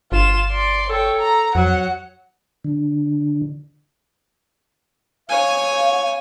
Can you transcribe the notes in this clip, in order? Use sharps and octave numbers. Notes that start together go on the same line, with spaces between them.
G1 F4 E7
D5 C6
A4 C#5 G5
A#5
F2 F#3 F#5
D3
C#5 F5 G#5